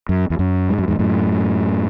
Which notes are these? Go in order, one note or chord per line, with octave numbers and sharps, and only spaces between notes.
F#2
E2
F#2
G#2
F#2
E2 G#2
F#2 A2